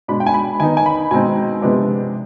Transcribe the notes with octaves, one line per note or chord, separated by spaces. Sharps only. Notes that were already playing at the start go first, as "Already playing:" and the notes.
B2 G#3 D4 B5
G5
G#5
B5
D#3 B3 D#4 G#5
G#5
B5
B2 G#3 C4 D#4 G#5
C3 F3 G#3 B3 D4